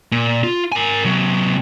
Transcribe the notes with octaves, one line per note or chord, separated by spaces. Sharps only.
A#2
F4
A#4 G#5
C3 F#3